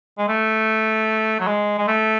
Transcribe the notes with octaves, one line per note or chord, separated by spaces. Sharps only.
G#3
A3
F#3
G#3
G#3
A3